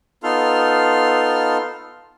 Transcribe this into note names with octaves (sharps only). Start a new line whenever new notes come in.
B3 D#4 F4 A4 C6 F6